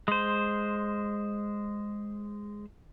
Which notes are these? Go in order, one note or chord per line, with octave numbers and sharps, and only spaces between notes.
G#3 C5